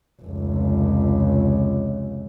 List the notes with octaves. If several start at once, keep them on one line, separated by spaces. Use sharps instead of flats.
F1 C#2